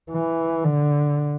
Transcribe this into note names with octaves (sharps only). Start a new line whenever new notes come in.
E3
D3